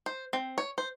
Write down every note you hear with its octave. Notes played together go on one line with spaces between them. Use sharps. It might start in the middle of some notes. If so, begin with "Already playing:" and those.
C5
C4
C#5
C5